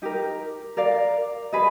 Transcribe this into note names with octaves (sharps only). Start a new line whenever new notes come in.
D#4 G4 A#4
A#4 D5 F5
G#4 B4 D#5